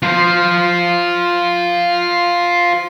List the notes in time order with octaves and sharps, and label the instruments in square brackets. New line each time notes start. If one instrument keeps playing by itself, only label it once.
[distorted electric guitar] F4 C5